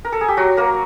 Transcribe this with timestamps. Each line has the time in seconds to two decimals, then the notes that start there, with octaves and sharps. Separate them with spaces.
0.05 A#4
0.12 A4
0.21 G#4
0.28 G4
0.37 F#3 F#4
0.57 A#3 A#4